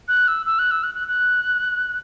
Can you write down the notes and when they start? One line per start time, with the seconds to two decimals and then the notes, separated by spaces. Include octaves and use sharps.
0.08 F#6
0.28 E6
0.46 E6
0.59 F#6
0.71 E6
0.83 F#6
0.95 F#6
1.08 F#6